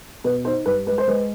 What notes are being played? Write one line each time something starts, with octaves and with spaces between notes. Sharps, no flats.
B2 B4
D#4 C5
G2 B4
G#3 B4
C5
G#3 B4